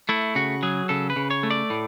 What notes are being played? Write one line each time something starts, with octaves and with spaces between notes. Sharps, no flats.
A3 E4
C#3 F#4
F#3 G#4
C#3 A4
B4
C#3
C#5
A3
D5
A2